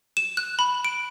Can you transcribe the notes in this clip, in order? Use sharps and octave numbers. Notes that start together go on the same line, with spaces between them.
E7
F#6
B5
D7